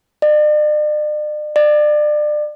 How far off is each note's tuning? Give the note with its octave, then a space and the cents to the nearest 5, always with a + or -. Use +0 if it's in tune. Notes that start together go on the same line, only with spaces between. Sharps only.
D5 +45
D5 +30